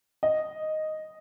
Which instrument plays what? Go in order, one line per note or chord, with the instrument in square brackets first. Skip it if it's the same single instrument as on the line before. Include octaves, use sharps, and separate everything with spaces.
[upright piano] D#5